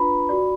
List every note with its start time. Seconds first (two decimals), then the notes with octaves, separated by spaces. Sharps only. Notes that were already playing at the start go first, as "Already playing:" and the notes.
Already playing: D4 F4 B4 A#5 B5
0.29 F#4 D5